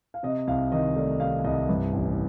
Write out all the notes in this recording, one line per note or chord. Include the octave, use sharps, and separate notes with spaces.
F5
C3 D#5
C2 F5
D#3 D#5
A3 D5
C3 F5
F5
C2 D#5
G2
A1